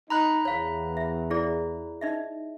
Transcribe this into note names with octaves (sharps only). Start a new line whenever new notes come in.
D#4 A#5 B5 F#6
E2 C#5 F5
E5
E4 G#4 D5
D#4 D#5 E5